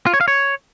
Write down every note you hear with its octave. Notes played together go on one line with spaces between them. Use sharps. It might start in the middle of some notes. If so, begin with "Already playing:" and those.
F4
C#5
F5
C#5